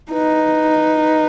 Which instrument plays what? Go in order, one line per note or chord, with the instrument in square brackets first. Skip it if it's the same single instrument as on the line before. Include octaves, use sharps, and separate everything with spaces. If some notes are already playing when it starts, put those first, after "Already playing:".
[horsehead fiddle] D#4 [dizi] B4